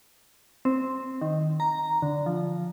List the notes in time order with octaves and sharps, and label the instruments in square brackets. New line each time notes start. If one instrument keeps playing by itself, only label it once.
[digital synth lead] C4
D#3
A#5
D3
F3